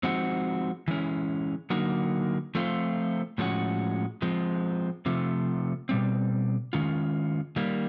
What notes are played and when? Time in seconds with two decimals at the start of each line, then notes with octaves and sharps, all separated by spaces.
0.03 F3 G#3 C4 D#4 F#4
0.88 E3 G#3 C#4
1.70 D3 F#3 A#3 D#4 F#4
2.55 F3 A3 C4 F4
3.38 A2 F3 G#3 C#4 F#4
4.22 F3 G#3 C4
5.06 C3 F3 A3
5.89 B2 G3 C4
6.73 D#3 G#3 C#4 F4
7.56 D#3 G3 A#3